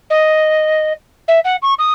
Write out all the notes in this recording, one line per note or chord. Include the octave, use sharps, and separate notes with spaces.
D#5
E5
F#5
C#6
D#6